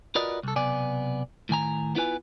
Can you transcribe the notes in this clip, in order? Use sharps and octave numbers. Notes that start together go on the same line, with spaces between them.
F4 F#4 A#4 B4 D5 D#5
C2 A4
B1 C3 B3 D5 G#5
A2 D#3 G#5 A#5
B3 E4 F4 B4 G#5